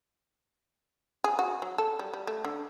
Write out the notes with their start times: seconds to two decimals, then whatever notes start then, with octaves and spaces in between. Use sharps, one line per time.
1.24 G#4
1.39 F#4
1.62 F#3
1.78 A4
1.99 G3
2.13 G3
2.27 A3
2.44 D3